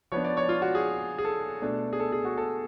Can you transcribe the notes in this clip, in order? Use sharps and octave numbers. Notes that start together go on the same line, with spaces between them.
F3 B3 D4 C#5
D5
C#5
F4
F#4
G#4
G#4
A4
B2 A3 D4
G#4
A4
G#4
F#4
A4